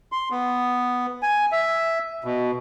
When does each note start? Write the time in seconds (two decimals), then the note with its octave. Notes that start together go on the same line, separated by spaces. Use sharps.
0.12 C6
0.31 B3
1.23 G#5
1.52 E5
2.24 B2